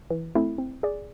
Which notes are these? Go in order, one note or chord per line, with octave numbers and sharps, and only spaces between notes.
E3
A3 C4 E4
C4
G#4 D5